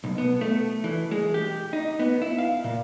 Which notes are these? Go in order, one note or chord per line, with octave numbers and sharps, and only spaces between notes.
B1
B3
A3
E3
G#3
G4
D#4
B3
E4
F5
A#2